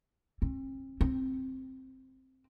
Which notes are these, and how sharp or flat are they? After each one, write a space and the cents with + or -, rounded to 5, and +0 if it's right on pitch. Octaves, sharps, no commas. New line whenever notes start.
C4 +40
C4 +5